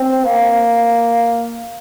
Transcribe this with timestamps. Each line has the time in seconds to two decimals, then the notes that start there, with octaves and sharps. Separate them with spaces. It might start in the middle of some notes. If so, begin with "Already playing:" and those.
Already playing: C4
0.24 A#3